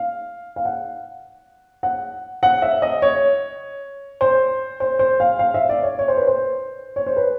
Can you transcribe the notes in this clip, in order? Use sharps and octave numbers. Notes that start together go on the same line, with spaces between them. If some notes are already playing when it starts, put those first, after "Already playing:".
Already playing: F5
F5
F#5
F#5
F#5
E5
D#5
C#5
C5
C5
C5
F5
F5
E5
D5
C#5
C#5
C5
B4
C5
C#5
C5
B4